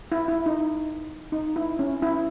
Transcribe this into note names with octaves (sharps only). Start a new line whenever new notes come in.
E4
E4
D#4
D#4
E4
C#4
E4